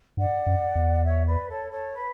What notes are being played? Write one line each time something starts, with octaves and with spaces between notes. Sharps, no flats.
G2 D5 F#5
F#2
E2
C#5 E5
B4 D5
A4 C#5
A4 C#5
B4